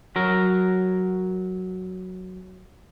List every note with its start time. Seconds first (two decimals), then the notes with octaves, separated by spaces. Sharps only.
0.16 F#3 A#4